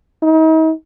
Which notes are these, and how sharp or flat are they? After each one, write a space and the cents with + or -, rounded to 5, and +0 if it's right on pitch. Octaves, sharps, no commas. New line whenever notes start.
D#4 +40